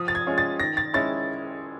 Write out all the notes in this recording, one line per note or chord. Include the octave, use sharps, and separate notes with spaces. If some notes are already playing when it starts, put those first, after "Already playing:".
Already playing: F3 D#6
A6
G#6
G#3 C#4 F4
A6
D#3 A#6
A6
G#3 C#4 E4 A6